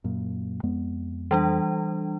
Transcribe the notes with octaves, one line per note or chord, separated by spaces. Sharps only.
F#2 A#2
F2 G#3 B3
E3 G3 D4